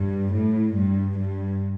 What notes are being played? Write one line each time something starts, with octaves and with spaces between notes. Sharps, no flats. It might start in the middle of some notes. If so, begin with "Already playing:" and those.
Already playing: G2
A2
G2
G2